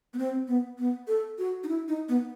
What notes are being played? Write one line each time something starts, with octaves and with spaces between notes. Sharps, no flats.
B3
C4
B3
B3
A4
F#4
D#4
E4
D#4
B3